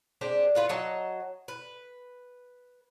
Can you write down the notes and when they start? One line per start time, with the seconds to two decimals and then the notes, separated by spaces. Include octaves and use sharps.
0.21 G#3 C4 D4 G4
0.55 B3 F4 B4
0.69 F#3 C#5 D#5 A5
1.48 B4